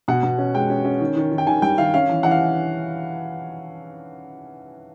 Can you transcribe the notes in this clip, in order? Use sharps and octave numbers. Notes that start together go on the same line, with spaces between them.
B2 F#5
B2
C#4
G#3 G5
C#4
C#4
D#3
D#3
D#3
G5
D#3 G#5
G3 G5
D#3 F5
C#4 F5
E3
E3 F#5
F5